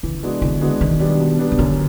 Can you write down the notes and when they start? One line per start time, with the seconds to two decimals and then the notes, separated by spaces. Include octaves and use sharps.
0.03 C#3 E3
0.23 G#3 B3 D4 F#4
0.42 D3 E3
0.61 G#3 B3 D4 F#4
0.81 B2 D#3
1.00 G3 B3 D4
1.20 B2
1.39 G3 B3 D4
1.52 C#3
1.59 F#2 D3